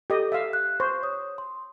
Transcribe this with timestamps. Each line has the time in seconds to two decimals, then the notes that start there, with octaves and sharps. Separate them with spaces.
0.10 G4 A4 D#5
0.32 E5 F5
0.53 F#6
0.80 C5 C#6
1.02 C#5 D#6
1.38 C6